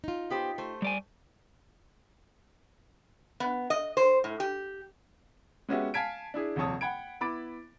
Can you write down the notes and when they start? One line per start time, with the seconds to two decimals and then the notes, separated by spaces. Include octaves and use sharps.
0.04 D#4 F4
0.30 B3 G4 C5
0.58 A3 C5
0.82 G3 D5 G#5
3.40 B3
3.70 D#5
3.97 C5
4.24 A2
4.40 G4
5.69 G#3 B3 C#4 F#4 G4 E5
5.94 F5 G#5 A5 G#6 B6 D7
6.34 D4 E4 G#4
6.56 D#1 C3 F3 C#5 A5 D#6
6.81 F#5 G5 B5 G#6 D7
7.21 B3 E4 B5 D6 A6 D7